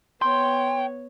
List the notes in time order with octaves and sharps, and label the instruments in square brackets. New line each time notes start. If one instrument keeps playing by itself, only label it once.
[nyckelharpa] B3 C#5 [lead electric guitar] G5 [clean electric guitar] C6